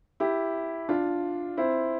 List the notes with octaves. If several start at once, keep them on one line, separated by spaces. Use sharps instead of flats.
E4 G4
D4 F4
C4 E4